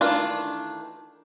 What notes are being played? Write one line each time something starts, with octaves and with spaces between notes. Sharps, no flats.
D#3 E3 A3 D4 F4